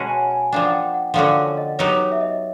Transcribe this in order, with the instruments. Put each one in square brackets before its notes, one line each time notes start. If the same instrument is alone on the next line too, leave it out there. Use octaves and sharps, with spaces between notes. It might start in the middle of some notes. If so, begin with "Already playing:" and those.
Already playing: [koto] B2 G#3 C#4 F#4 [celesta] A5 B5
[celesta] G#5
G#5
[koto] F3 A#3 D4 [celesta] G5
[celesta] F#5
G5
F#5
[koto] D3 F3 A#3 C#4 F#4 [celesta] F#5
[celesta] F#5
F5
D#5
[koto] F#3 B3 D#4 G4 A#4 [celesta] C#5
[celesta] C#5
E5
D#5